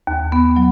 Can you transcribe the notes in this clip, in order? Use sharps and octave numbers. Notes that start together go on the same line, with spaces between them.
D#2
B3
F#3